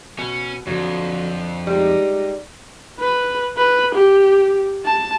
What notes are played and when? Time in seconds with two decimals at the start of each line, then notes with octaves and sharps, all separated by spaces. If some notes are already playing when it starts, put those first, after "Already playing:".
0.19 B2 C#4
0.67 F2 D3 F#3
1.67 G3 G#3 D#4 G4
3.00 B4
3.57 B4
3.95 G4
4.85 A5